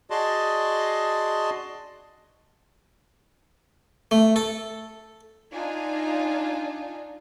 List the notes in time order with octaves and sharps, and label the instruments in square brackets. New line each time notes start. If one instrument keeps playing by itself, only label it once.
[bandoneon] F#4 G#4 D5 D#5 A5 C6
[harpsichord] A3
A4
[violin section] D4 D#4 F4 G#5